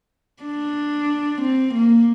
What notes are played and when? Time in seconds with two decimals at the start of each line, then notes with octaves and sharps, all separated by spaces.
0.43 D4
1.42 C4
1.74 A#3